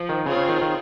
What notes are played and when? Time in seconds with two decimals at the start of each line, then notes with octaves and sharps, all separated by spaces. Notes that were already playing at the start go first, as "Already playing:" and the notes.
Already playing: F3
0.09 D#3
0.25 C#3 C4 F4 G#4 C#5
0.37 C#3
0.49 D#3
0.62 D#3